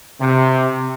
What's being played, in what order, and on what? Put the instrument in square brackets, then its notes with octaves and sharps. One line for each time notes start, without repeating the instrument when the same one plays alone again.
[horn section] C3